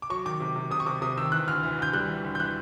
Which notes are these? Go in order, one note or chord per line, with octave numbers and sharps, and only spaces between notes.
D6
F#3 C#6
D#3 D6
C3
C3
C3 D#6
C#6
C3 D6
C3 D#6
D#3 E6
E3 F#6
D2 F6
E3
D2 G6
G3 F#6
E3
D2
G6
E3 F#6